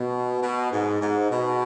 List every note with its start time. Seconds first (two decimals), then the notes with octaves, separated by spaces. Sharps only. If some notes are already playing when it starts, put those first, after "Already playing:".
Already playing: B2
0.41 B2
0.72 G#2
1.01 G#2
1.30 B2